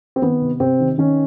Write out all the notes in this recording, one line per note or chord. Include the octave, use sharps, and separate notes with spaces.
C4
D#3 B3
C3
C3 C4
D#3
D#3 C#4